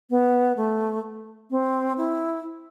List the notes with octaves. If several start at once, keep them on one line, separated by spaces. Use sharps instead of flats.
B3
A3
C4
E4